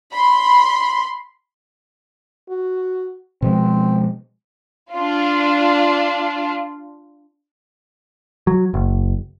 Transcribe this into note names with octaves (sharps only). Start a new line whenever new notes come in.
B5 C6
F#4
B2 F3 G#3 C4
D4 F4
F#3
F#1